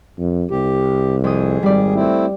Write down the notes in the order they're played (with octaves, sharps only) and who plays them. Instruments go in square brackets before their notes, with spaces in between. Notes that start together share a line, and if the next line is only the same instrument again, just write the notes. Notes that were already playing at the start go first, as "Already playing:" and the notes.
[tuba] F2
[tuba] C2 [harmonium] G4
[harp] F2 D#6 [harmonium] G#4
[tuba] G#1 [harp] G3 D5
[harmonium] A3 C4 E4